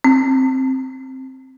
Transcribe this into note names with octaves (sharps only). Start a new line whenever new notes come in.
C4